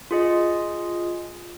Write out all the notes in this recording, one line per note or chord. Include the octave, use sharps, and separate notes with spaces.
F4 G#4 D#5